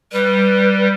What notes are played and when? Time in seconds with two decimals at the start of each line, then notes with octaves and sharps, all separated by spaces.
0.13 G3 B4